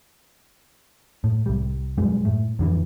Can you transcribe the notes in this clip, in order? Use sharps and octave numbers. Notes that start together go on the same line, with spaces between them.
A2
C2 G3
B1 F#2 G3 G#3
A2
F2 D3 E3